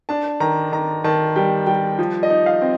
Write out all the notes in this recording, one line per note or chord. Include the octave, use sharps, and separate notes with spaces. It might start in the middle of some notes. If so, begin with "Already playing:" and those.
D4 A5
D#3 A#5
D#3 A#5
D#3 A5
G3 G5
G3 G5
F3
D#5
D#4
F5
C4